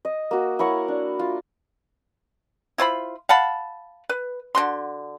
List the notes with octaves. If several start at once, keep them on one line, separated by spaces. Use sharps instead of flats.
D#5
A#3 F#4
E4 A#4 C#5 F#5
D4
F4
E4 F4 C5 B5
F5 F#5 A5 B5
B4
D3 F#4 C6